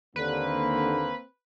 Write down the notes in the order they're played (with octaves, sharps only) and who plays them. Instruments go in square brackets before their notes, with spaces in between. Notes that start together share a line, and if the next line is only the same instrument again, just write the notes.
[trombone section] D#2 D3 [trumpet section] A#3 C4 [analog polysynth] B4